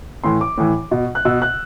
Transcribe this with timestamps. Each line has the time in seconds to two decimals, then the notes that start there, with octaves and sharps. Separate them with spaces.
0.24 A2 E3 C6
0.41 D6
0.58 A2 E3
0.91 B2
1.15 F#6
1.25 B2 E6
1.42 F#6